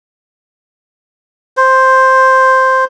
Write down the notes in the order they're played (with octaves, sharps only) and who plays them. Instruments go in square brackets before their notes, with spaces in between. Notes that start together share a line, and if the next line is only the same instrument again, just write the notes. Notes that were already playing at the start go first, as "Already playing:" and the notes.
[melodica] C5